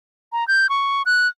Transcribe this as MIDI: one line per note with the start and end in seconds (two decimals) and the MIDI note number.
0.33 0.46 82
0.48 0.69 91
0.69 1.02 85
1.06 1.28 90